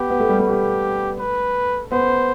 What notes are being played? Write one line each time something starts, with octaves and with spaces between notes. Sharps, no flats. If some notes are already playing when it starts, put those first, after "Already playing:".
Already playing: B3 G4
B3
A3
G3
A3
G4
B4
B3 C5